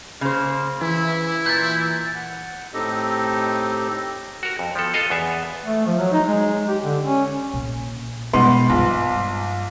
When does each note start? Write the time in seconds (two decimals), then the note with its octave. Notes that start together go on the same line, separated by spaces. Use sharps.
0.21 C#3 A#3 C5
0.81 E3 E4
1.46 A#2 G6 A6
2.15 F#5
2.74 A2 C4 D#4 G4 A4 D#5
4.43 F#4 A#4
4.59 F2
4.75 F3 B3 A4
4.94 F4 A4 D#5 F5
5.10 E2 B3 E5
5.65 A3
5.86 F3
5.99 F#3
6.12 D#4
6.27 G#3
6.69 G4
6.84 D3
7.04 C#4
7.54 A#1
8.33 G#2 B2 G3 B3 C6
8.70 A#1 G2 G3